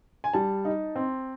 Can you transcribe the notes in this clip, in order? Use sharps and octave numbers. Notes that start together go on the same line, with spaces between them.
G#5
G3 A5
D#4
C4